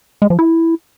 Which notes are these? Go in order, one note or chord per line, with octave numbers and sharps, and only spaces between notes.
G#3
F3
E4